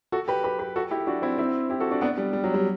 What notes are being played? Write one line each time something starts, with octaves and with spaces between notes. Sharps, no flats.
F#4 A4
G4 B4
G4 B4
G4 B4
F#4 A4
E4 G4
D4 F#4
C4 E4
C4 E4
E4 G4
F#4 A4
D4 F#4
B3 D4
G3
G3
F#3
G3